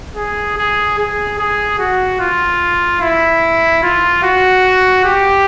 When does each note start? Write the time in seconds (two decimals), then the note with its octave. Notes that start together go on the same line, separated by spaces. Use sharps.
0.16 G#4
0.57 G#4
0.98 G#4
1.38 G#4
1.79 F#4
2.20 F4
3.01 E4
3.83 F4
4.23 F#4
5.05 G4